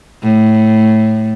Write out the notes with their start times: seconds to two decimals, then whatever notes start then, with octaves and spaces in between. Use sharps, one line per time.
0.23 A2